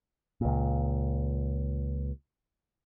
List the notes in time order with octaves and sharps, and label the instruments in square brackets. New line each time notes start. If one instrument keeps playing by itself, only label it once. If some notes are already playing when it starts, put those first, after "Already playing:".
[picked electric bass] C#2 A#2